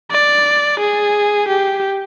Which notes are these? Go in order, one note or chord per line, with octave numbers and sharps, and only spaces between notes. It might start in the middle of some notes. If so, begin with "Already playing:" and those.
D5
G#4
G4